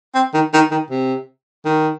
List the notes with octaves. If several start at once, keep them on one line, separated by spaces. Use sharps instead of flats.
C4
D#3
D#3
D#3
C3
D#3